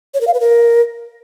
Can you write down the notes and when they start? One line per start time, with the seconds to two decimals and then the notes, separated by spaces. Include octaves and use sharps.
0.14 C#5
0.21 A#4
0.27 F5
0.34 B4
0.40 A#4